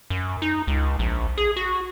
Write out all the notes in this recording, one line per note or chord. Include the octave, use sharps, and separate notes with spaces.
F#2
D#4
C#2
A#1
G#4
F#4